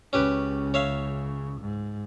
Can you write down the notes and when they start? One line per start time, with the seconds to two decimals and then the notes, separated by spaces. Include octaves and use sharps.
0.13 C#2 C#3 C#4 G4 B4
0.74 C#5 E5 F5
1.61 G#2